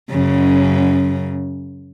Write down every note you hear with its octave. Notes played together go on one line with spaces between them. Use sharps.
F#2 C#3